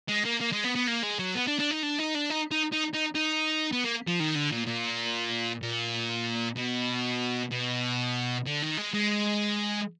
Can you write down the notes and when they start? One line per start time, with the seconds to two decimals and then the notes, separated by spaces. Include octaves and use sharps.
0.09 G#3
0.25 A#3
0.41 A#3
0.52 G#3
0.65 B3
0.76 B3
0.88 A#3
1.03 G#3
1.19 F#3
1.35 B3
1.47 D4
1.59 D4
1.71 D#4
1.83 D4
1.98 D#4
2.15 D4
2.30 D#4
2.51 D#4
2.72 D#4
2.94 D#4
3.15 D#4
3.72 B3
3.84 A#3
4.08 F3
4.20 D#3
4.35 D3
4.51 A#2
4.67 A#2
5.62 A#2
6.57 B2
7.51 B2
8.46 D3
8.62 D#3
8.77 G#3
8.94 G#3